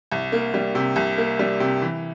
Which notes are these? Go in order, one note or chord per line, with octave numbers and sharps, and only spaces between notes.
C2
A#3
G3
C3
C2
A#3
G3
C3
E3